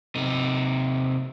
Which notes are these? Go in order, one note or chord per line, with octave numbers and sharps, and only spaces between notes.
C3 D#4